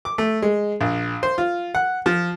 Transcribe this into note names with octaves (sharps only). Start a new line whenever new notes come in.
D6
A3
G#3
A#1
C5
F4
F#5
F3